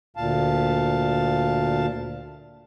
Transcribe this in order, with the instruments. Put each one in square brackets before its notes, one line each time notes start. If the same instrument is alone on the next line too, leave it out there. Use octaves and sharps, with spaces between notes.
[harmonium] D2 A#2 F5 A5